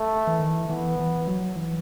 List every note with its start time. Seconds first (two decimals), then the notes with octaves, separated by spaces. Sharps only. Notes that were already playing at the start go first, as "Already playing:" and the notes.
Already playing: A3
0.27 E3
0.39 D#3
0.50 E3
0.69 E3 B3
1.00 E3
1.27 F#3
1.56 E3